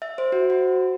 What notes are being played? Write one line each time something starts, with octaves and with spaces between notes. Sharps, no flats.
E5
C5
F#4
F#4